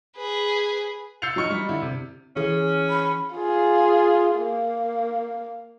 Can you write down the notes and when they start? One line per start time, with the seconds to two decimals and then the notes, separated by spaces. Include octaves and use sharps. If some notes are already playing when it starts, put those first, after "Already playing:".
0.16 G#4 B4
1.22 E6 G6 A6 C7 C#7 F7
1.36 F#3 D#4 C#6 F6 C#7
1.50 G3
1.69 D3 E4
1.82 C3
2.36 E3 C#4 G#4
2.90 B5
3.35 F4 G#4
4.36 A#3